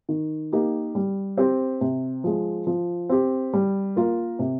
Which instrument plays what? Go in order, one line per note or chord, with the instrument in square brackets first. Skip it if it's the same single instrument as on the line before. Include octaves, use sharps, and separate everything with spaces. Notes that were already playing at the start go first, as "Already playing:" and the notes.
[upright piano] D#3
A#3 D#4 G4
G3
C4 G4 C5
C3
F3 G#3
F3
C4 G4
G3
A#3 F4 A#4
C3